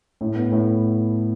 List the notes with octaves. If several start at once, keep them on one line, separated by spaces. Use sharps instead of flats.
A2
B3
A2